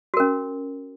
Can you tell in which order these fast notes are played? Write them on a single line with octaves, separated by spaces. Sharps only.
F#4 A#4 C#4